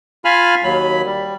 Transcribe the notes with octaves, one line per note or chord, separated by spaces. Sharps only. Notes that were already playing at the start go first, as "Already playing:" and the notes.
F4 F5 G#5 B5 F6
D#2 F#3 B5
G3